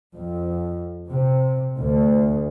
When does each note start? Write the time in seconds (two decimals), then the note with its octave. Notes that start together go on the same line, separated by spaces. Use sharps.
0.14 F2
1.08 C3
1.79 D2